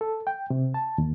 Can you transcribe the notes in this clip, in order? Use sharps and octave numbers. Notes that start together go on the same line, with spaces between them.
A4
G5
C3
A5
D#2